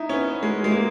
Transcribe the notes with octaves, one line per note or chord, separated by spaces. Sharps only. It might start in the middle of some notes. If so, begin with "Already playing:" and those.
Already playing: D#4 E4
C#4
B3
G#3
G#3
A#3